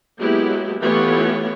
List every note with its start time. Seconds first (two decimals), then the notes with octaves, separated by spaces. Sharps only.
0.19 F#3 G#3 A#3 B3 E4 G4
0.81 E3 A3 B3 F4 G4 C#5